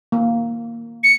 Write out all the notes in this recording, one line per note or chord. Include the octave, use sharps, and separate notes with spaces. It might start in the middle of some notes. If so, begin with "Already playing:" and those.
A#3
C#7